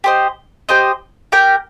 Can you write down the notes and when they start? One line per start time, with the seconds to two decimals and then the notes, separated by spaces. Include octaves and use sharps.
0.04 G4 C5 D#5
0.69 G4 C5 D#5
1.32 G4 A#4 G5